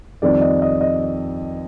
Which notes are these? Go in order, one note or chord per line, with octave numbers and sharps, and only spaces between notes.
F2 D#3 G3 D5
D#5
D#5
D#5